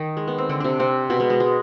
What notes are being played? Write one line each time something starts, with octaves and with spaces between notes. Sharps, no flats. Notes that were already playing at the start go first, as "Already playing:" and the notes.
Already playing: D#3 D#4
G#3
B3
C4
D3 D4
C3 C4 D4
C3 C4
B2 B3
G#3
G#3
G#3